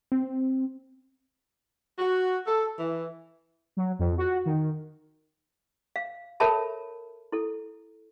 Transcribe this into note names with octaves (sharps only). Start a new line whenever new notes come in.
C4
F#4
A4
E3
F#3
F2
F#4
D#3
F5
A4 A#4 C#5 E5 A5 B5
E4 A4